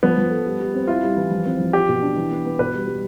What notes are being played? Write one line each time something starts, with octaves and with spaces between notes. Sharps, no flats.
F3 B3
F3
A4
G3
G3
C4
E4 F4
G3
E3
F3
C4
F3
F4 G4
B2
D4
E3
B3
B3
B2 B4
G3
G3